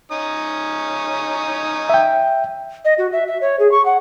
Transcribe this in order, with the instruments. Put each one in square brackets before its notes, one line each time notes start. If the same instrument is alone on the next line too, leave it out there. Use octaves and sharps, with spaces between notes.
[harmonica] C#4 D#4 D#6
[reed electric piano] E5 G5
[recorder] D#5
F#4
E5
E5
C#5
G#4
C#6
F#5